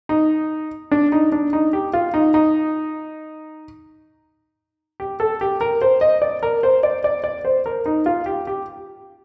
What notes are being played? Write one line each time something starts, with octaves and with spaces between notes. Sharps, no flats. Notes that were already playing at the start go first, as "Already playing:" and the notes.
D#4
D4
D#4
D4
D#4
G4
F4
D#4
D#4
G4
A4
G4
A#4
C5
D#5
D5
A#4
C5
D5
D5
D5
C5
A#4
D#4
F4
G4
G4